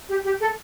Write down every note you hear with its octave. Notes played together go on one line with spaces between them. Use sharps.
G4
G4
A4